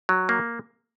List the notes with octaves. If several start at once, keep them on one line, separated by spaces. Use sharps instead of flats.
F#3
A#3